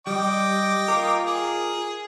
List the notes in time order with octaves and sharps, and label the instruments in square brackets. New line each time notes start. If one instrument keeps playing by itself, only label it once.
[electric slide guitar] G3 [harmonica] D#5 G5 D6
[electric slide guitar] F4 A#4
[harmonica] G#4